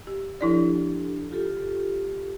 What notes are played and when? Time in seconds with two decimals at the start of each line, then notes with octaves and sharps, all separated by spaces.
0.07 G4
0.41 F3 D4 E4 G4 A4 D5
1.31 F4 G4 A4